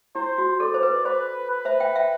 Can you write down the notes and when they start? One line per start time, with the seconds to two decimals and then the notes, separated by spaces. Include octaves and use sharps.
0.15 E4 C5
0.38 F#4
0.60 A4 D5
0.74 C5
0.83 B4
1.05 B4 C5
1.50 B4
1.65 C5 E5
1.80 E5 G5
1.95 E5 G5